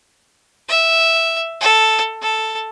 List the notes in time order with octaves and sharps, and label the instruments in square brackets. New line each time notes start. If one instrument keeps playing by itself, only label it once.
[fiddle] E5
A4
A4